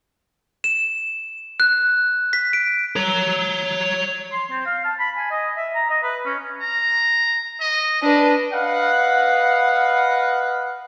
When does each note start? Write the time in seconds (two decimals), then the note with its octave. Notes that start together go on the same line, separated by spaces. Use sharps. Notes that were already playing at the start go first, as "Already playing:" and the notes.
0.64 E7
1.60 F#6
2.33 B6
2.53 D7
2.96 C#5 A#5
4.32 C6
4.51 C4
4.66 F5
4.85 A5
4.99 B5
5.17 G#5
5.31 D#5
5.56 E5
5.74 A#5
5.90 D#5
6.03 B4
6.25 C#4
6.60 A#5
7.60 D#5
8.02 D4 B4 D#5
8.53 B4 D#5 F5 F#5